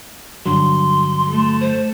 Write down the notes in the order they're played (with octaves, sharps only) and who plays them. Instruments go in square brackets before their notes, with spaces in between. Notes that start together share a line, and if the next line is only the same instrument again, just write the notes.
[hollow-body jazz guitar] G2 D3 F#3 [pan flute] C6
[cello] A3
[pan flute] C5